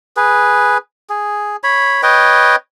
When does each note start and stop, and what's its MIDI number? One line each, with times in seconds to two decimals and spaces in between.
0.17 0.78 68
0.17 0.78 71
1.10 1.56 68
1.64 2.02 73
1.64 2.02 83
2.03 2.56 71
2.03 2.56 73
2.03 2.56 75
2.03 2.56 79